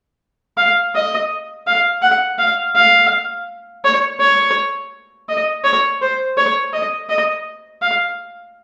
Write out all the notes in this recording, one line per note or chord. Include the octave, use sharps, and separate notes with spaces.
F5
D#5
F5
F#5
F5
F5
C#5
C#5
D#5
C#5
C5
C#5
D#5
D#5
F5